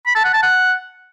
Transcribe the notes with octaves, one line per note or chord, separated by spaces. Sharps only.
B5
A5
F#5
A5
F#5